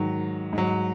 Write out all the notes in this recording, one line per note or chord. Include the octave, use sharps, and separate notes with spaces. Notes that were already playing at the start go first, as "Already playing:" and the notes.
Already playing: G#2 D#3 F#3
G#2
F#3